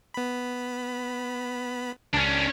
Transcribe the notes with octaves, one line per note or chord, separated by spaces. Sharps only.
B3 B5
C#2 C#4 D4